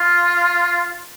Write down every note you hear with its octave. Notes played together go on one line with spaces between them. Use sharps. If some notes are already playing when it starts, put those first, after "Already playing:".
Already playing: F4